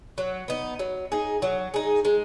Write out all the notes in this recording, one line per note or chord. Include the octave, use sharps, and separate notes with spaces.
F#3
B3 D#4
F#3
D#4 G#4
F#3
D#4 G#4
G#3